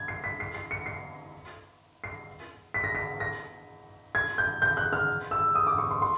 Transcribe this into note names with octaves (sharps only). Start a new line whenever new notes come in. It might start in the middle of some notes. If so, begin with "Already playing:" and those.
Already playing: G#6
C7
B6
C7
C7
C#7
C7
C7
B6
A#6
B6
A#6
G#6
G6
G6
F#6
F6
E6
D#6
D6
C#6
C6
C6